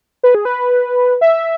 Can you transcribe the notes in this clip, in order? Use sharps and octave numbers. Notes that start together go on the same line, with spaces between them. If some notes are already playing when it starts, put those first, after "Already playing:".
B4
G#4
B4
E5